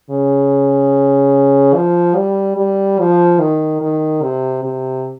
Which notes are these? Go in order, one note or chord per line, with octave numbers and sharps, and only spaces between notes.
C#3
F3
G3
G3
F3
D#3
D#3
C3
C3